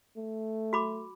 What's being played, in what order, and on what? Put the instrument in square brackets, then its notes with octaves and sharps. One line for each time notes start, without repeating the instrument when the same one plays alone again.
[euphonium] A3
[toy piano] F#4 B5 D6